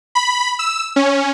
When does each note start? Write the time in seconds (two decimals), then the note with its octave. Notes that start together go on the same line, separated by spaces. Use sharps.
0.15 B5
0.59 E6
0.96 C#4